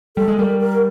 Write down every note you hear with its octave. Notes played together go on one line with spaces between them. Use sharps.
G3 A4
G#3
G3 A#4
A#4